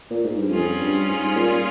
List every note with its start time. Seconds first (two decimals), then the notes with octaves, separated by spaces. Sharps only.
0.11 A#2
0.24 G#2
0.37 G2
0.49 F2 G3 C#4 F4 G#4
0.79 G2
1.08 G#2
1.36 A#2